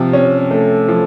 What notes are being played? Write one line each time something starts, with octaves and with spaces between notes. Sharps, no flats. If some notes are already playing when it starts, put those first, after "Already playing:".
Already playing: C3 F3
C#4
A3
F3